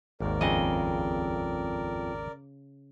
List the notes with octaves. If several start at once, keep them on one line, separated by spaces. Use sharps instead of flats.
G#1 D#2 A#4 D5
F2 C#3 D#5